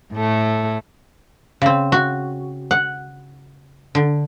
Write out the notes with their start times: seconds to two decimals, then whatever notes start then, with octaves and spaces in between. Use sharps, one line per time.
0.14 A2 A3
1.62 C#3 C4
1.92 F#4
2.71 F#5
3.95 D3